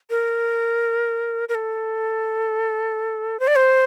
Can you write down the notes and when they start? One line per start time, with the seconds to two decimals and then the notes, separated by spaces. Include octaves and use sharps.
0.10 A#4
1.49 A#4
1.55 A4
3.40 C5
3.47 D5
3.56 C5